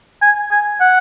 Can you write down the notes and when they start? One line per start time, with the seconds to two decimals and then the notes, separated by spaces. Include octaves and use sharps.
0.22 G#5
0.51 G#5
0.80 F#5